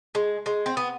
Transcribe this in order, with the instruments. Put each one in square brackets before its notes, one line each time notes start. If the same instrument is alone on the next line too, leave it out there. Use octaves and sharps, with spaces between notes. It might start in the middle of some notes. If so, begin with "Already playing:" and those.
[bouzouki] G#3
G#3
C4
B3